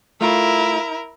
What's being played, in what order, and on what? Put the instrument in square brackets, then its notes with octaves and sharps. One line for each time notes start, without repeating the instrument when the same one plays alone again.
[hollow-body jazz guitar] A3 F4 [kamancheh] E4 A#4